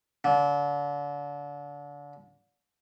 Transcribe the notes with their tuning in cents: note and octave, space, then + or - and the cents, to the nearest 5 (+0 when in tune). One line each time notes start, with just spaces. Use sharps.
D3 -35